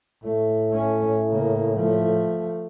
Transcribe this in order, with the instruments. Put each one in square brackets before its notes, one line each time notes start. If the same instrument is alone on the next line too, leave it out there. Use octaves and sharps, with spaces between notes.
[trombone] A2 [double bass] A3
[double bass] A3 C#4
C#3 A#3
F3 A3